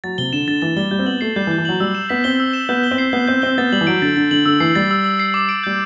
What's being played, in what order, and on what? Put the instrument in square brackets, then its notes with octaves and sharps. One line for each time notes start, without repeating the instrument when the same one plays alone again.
[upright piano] F#3 [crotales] A6
[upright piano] C3 [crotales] G7
[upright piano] D3 [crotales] E7
[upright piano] D3 [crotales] A6
[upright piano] E3 [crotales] A6
[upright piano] G3 [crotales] G7
[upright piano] G3 [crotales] G6
[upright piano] C4
[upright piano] B3 [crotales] F#7
[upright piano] A3 [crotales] C7
[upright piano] G3 [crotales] G6
[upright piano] E3
[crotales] G6
[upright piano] E3
[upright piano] F#3 [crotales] F#7
[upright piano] G3 [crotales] E6
[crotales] E7
[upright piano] B3 [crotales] B6
[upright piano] C4 [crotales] G7
[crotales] E6
E7
[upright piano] B3 [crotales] G6
[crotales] G7
[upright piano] C4
[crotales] C7
[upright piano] B3 [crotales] G6
[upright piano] C4 [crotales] G6
[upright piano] C4 [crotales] G7
[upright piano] B3 [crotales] A6
[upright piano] G3 [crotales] F#7
[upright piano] E3
[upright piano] F#3 [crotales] D7
[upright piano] D3 [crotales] A6
[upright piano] D3 [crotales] A6
[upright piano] D3 [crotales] F#7
[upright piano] D3 [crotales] E6
[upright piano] E3 [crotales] C7
[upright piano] G3 [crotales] A6
[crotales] E6
E6
C7
D6
D7
[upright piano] G3 [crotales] G6